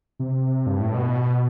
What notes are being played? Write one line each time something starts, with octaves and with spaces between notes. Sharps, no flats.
C3
G2
A2
B2